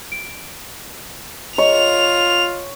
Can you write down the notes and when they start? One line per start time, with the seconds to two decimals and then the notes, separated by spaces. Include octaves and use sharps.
0.12 D7
1.58 F4 C#5 D#5 F7